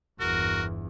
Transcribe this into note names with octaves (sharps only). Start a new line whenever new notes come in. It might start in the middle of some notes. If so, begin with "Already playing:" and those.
G1 E2 F#4 A#4